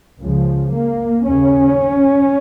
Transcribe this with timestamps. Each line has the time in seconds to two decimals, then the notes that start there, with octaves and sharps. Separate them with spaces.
0.21 C#2 C#3 F3
0.73 A#3
1.25 D#2 C#3 C#4